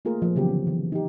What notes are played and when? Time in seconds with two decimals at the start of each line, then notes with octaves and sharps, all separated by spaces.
0.05 A3 A#3 F4 G#4 A#4
0.22 F3
0.36 C#3 E3 F#3 B3 G4
0.48 D3
0.67 E3
0.92 D#4 G4